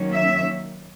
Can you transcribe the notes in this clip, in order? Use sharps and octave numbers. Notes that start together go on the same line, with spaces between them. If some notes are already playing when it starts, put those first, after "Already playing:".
Already playing: D#3 F#3 A#3 C#4
E5